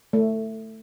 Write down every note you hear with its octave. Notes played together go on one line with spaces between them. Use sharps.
A3